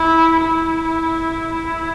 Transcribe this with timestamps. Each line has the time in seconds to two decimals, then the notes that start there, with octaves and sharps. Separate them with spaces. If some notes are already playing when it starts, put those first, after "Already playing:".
Already playing: E4
0.40 E4
1.52 E4